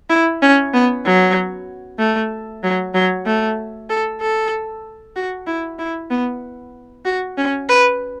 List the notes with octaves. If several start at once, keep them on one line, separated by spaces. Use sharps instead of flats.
E4
C#4
B3
F#3
A3
F#3
F#3
A3
A4
A4
F#4
E4
E4
B3
F#4
C#4
B4